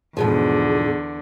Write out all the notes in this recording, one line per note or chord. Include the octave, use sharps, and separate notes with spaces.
E2 G#2 B2 D3 F3 G#4